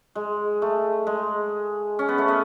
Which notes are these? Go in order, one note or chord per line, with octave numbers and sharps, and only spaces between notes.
G#3
A3
G#3
C#4
B3
A3
B3